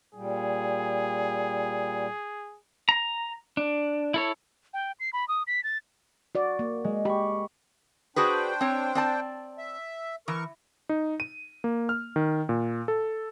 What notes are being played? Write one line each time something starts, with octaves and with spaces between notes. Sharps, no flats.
A#2 G3 G#4
A#5
D4
E4 A4 C#5
G5
C7
B5
D#6
B6
A6
F#4 D5
A#3
G#3
G4 B5 C#6
D4 F#4 G#4 B4 C5 G5
C4 C#5
C4 D5 A5
E5
E3 A#4 C#6
D#4
D#7
A#3
F6
D#3
A#2
A4